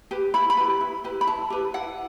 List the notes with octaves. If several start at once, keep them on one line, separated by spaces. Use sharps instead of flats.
G4 B4
E4 B5
B5
G4 B4
E4
G4 B4
B5
E4 A5
G4 B4
E4 F#5